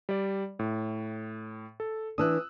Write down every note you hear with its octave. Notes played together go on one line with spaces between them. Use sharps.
G3 D5
A2
A4
E3 D4 D#6 E6 F#6